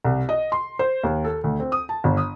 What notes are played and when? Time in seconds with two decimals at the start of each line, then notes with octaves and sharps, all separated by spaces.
0.05 C2
0.29 D#5
0.52 C6
0.79 C5
1.03 D#2
1.24 A4
1.44 D2
1.60 C4
1.72 D#6
1.89 A5
2.04 G1
2.17 D#6